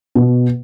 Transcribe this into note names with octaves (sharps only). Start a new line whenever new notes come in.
B2